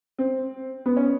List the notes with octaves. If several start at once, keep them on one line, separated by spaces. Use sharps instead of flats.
C4
B3
C#4